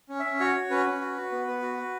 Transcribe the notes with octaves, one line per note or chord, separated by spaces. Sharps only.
C#4
E5
C#4
F#4 C#5
F#4
C#4 B4
C#4
F#4
F#4
B3
B3
F#4
F#4